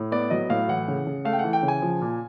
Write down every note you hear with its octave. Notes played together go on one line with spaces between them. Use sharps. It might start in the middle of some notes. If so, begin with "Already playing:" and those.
Already playing: A2
B3 D5
F#3 D#5
A2 F5
E3 F#5
C#3
C#3
A3 F5
G5
F#5
E3
G5
C#3
G#5
F3
A#2